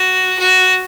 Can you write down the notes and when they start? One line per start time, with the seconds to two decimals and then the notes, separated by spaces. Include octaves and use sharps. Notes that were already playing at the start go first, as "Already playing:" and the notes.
Already playing: F#4
0.39 F#4